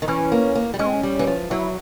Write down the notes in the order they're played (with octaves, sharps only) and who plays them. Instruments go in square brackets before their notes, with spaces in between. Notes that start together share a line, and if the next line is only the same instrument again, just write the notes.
[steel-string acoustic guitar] D#3
[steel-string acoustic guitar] E3 [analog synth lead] C#4
[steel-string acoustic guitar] A#3
A#3
G3
[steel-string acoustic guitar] G#3 [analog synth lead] C#4
[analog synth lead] C4
C#4
[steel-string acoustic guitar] G3
E3
F3
[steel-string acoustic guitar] F#3 [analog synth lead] E4